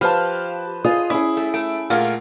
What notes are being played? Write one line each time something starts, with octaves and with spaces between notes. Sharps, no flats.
F3 G4 B4 C5 F5 A5 F6 F#6
F4 G#4 D#5 D#6
C#4 E4 G#4
A3
A3 D7
A#2 A3 F4 G#4 A#4 F#5